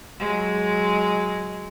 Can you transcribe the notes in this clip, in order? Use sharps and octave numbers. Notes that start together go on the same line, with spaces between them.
F#3 G#3